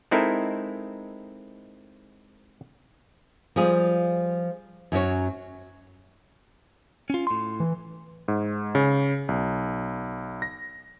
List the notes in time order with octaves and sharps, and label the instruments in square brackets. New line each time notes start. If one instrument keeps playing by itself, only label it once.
[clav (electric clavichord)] G#3 C4 D#4 E4 A4 A#4
[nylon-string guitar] F3 G3 F4 G#4
F#2 F#3 C#4 C#5
[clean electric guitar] C#4 F4
A2 C6
[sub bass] E3
[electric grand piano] G#2
C#3
B1
A#6